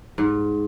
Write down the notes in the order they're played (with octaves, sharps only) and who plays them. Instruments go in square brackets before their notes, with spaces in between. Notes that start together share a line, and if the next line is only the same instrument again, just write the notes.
[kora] G#2